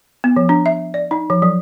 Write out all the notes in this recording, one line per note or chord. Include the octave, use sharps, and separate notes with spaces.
B3
F3
D4
E5
D5
D#4
F3
F#3